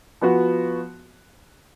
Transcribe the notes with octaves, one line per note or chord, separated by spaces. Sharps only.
F3 B3 F#4